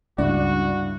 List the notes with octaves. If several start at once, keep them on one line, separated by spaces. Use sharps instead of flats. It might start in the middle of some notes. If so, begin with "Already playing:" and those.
C#2 G2 C#3 E4 F#4 D5